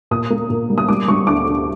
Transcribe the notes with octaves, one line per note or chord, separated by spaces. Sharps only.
A#2 D#6
A#3
A#2
G3
D#6
G3 D6
G3 C#6
D2 D6
D2